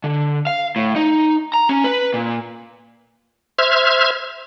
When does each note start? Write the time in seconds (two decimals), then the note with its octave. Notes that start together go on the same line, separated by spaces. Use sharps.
0.04 D3
0.47 F5
0.76 A2
0.96 D#4
1.54 A#5
1.69 C#4
1.84 B4
2.14 A#2
3.59 C5 E5 F6 G#6